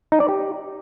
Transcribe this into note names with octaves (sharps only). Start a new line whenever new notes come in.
D#4
D5
G4